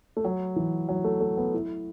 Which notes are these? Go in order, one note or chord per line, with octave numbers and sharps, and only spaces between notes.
A3
F#3
E3
F#3
A3
A3
B3
E4